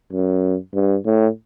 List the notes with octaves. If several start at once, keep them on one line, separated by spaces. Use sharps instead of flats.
F#2
G2
A2